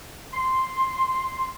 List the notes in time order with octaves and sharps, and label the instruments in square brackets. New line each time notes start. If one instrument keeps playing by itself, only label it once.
[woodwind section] C6